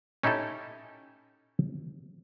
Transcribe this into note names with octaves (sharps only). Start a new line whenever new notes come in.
C#4 D#4 E4 G4 A4